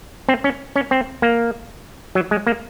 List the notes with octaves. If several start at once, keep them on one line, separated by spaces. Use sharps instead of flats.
C4
C#4
C#4
C4
A#3
F#3
G#3
A#3